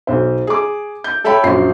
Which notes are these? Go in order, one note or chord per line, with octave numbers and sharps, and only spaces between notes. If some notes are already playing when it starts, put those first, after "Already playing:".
B1 C5
G#4 D6
G6
A4 C#5 E5 G5 B5
A#1 F#2 F4 C7